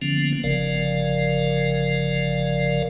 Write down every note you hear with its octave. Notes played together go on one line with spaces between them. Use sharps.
D3 F3 A#3 B3 C#4
G1 C#3 F3 A#4 D5 F5